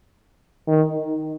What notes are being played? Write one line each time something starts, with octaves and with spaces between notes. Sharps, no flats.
D#3